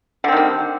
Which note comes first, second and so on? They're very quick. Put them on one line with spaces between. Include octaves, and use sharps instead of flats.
D3 C4 D#3 G3